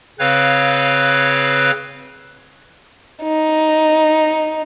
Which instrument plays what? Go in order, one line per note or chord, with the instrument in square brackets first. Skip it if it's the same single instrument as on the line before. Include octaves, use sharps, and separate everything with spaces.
[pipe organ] C#3 C4 B4 C#5 F5 F#6
[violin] D#4